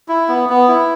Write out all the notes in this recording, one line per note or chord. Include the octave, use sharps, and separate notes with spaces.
E4
B3
B3
E4